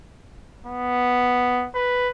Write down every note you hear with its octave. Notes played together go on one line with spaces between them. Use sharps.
B3
B4